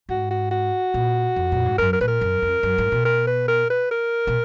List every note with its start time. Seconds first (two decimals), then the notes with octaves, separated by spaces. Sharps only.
0.09 G#2 F#4
0.30 F#4
0.51 F#4
0.94 A#2
1.36 F2
1.52 A#2
1.65 G#2
1.78 F#2 A#4
1.93 A#4
2.01 A#2 B4
2.08 A#4
2.21 F#2
2.42 F2
2.63 F#2
2.78 G#2
2.92 B2
3.05 A#4
3.27 B4
3.48 A#4
3.70 B4
3.91 A#4
4.27 B2